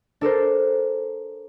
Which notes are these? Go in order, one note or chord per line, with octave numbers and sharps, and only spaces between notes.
D4 A4 A#4 C5